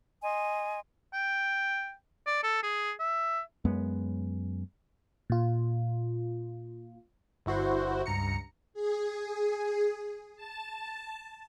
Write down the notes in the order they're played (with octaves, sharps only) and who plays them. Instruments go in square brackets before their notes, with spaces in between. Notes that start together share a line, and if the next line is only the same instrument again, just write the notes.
[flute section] D#5 G#5 C6
[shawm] G5
D5
A4
G#4
E5
[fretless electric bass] F#2 G#3 B3
[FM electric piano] A#2 F4
[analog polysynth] G1 E4 F#4 C5
C#2 G2 A#5 C#7
[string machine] G#4
A5